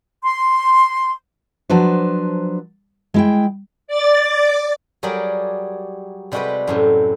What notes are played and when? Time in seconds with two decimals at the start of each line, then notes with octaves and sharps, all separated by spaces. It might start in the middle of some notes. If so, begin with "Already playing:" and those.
0.23 C6
1.70 F3 F#3 D4 B4 C5
3.14 G#3 E4 G5
3.88 D5 A6
5.03 F#3 G3 G4 G#4 A#4 D5
6.32 C3 G3 G#3 F#4 G4 B4
6.67 F#2 A2 C3